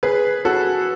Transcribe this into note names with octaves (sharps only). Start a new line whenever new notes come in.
G#4 B4
F#4 A4